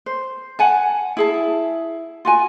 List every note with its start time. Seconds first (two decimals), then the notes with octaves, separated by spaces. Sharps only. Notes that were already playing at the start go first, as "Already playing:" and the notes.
0.06 C5
0.59 F#5 G#5 A5
1.17 E4 G#4 A5
2.25 F4 F#4 G#5